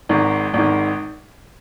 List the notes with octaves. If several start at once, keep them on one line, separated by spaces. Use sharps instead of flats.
G#1 G#2 D#3
G#1 G#2 D#3